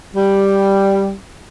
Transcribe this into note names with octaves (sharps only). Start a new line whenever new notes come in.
G3